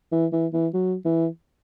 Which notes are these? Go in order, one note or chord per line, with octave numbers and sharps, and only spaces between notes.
E3
E3
E3
F#3
E3